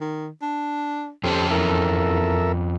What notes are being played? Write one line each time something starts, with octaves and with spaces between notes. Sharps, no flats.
D#3
D4
F2 C#4 G4 A4 C5 A5
E2 A4 A#4 E5